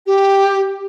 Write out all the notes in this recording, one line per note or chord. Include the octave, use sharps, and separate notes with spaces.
G4